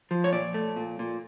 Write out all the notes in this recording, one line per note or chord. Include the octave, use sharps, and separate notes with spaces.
F3
C#5
A#2 D5
A3
A#2
A#2